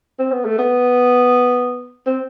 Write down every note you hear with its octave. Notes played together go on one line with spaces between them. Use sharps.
C4
B3
A3
B3
C4